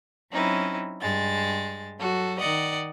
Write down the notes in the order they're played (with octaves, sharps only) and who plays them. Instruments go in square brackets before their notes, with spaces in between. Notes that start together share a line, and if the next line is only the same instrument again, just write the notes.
[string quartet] F#3 C4 C#4 D#4 E4
G2 G#3 A6
F#3 F#4 A4
D#3 D5 D#5 F#5